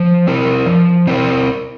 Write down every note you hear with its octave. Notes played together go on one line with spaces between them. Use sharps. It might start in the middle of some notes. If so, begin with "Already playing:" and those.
Already playing: F3
C4 E4 A#4
F3
C4 E4 A#4